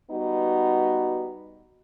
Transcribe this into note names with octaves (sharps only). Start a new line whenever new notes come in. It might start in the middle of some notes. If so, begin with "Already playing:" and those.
G3 B3 D#4 F#4